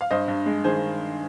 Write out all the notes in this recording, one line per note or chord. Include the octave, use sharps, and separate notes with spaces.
F5
G2 C5 D#5
G2
G#3
D#3 G#4 C5